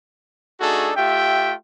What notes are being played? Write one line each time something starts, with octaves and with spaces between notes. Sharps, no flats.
A3 D4 D#4 F#4 G#4 A4
A3 F4 G4 E5 G5